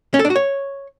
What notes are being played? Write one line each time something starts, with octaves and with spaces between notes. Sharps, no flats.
C#4
A4
D4
F#4
C#5